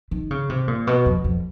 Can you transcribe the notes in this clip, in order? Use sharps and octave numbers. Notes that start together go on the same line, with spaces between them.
D#3
C#3
C3
A#2
B2
F2
F2